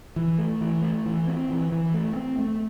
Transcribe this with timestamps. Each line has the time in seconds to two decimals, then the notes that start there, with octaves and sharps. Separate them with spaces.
0.16 E3
0.38 A3
0.61 E3
0.82 A3
1.06 E3
1.27 C4
1.50 E3
1.72 E3
1.94 A3
2.16 C4
2.39 A3